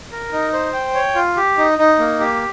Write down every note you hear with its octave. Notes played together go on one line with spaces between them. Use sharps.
A#4
D#4
C5
G5
C#5
F4
G4
D#4
D#4
A#3
G4